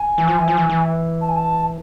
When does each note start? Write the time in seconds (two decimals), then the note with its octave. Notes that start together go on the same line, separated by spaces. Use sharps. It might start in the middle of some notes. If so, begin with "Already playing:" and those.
Already playing: G#5
0.18 E3
0.28 F3
0.38 E3
0.48 F3
0.57 E3
0.70 E3
1.21 A5
1.29 G#5
1.36 A5